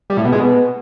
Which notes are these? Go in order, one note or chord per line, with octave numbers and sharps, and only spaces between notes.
G3
A2
B2
G#3
B2